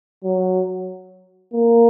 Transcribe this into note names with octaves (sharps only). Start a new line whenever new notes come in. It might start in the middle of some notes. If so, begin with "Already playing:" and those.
F#3
A#3